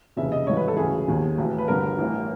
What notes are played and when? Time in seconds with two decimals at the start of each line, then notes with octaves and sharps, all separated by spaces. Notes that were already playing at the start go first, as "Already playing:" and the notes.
0.16 F1 D#2 C#3 E3 E5
0.32 D#5
0.47 G#1 G2 E3 C#5
0.57 B4
0.68 A4
0.77 D2 C#3 E3 G#4
1.08 E1 D#2 D#3
1.38 B1 A2 E3
1.58 B4
1.68 G1 G2 D3 A#4
1.98 A1 A2 E3